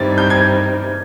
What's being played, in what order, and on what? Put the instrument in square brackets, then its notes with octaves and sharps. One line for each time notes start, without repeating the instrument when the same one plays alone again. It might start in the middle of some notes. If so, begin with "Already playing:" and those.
Already playing: [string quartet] G2 E3 G3 C4 D#4 [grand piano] G#6 A6
[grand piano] G6
G#6